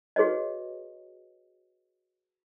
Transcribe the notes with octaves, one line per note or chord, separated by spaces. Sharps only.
F#4 G#4 B4 C#5 D#5